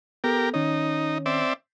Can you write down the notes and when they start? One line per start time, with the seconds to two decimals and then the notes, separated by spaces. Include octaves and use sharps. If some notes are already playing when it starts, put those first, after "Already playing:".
0.24 B3 G4 A4 A#4
0.54 D#3 C#4 D#4 C#5
1.26 C4 D5 E5